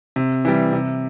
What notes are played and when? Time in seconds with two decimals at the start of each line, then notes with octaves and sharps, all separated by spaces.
0.16 C3
0.45 E3 G3
0.73 C3